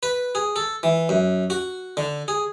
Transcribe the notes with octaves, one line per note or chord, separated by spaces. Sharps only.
B4
G#4
A4
E3
F#2
F#4
D3
G#4